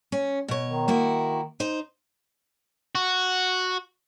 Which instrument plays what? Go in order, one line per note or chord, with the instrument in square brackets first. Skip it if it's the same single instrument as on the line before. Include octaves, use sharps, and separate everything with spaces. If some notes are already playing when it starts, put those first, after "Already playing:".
[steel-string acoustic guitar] C#4
B2 C#5
[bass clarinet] D#3
[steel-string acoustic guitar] A#3 E4 F#4
D#4 C5
[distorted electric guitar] F#4